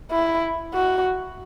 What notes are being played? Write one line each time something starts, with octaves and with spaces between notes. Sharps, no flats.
E4
F#4